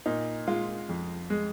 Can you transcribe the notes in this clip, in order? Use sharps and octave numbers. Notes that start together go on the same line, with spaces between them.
A#2 D#4
G#3 F4
F2
G#3